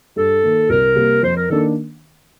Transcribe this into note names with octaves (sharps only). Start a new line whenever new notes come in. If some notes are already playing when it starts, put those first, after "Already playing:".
G2 A4
D#3 A#3
C2 A#4
C3 G3 A#3
F2 C5
A#4
D#3 A#3 D4 A4